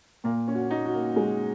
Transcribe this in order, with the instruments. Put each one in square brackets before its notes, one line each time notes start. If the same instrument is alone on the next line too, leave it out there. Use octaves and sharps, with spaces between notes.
[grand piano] A#2 [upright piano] A#3
[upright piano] C#4
[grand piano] F#4
[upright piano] D#4
[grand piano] F#4
[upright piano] A#3
[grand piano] G#3